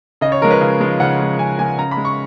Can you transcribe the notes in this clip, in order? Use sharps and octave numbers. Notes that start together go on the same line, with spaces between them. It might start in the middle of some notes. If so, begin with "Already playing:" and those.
C#3 D#5
C#5
F3 G#3 A#4
B4
C#3
F3 G#3
C#3 F#5
F3 G#3
C#3 G#5
F3 G#3 G#5
C#3 A#5
B5
G#3
C#6